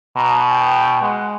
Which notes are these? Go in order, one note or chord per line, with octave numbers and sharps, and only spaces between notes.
B2 A#5
G5
G#3 F#5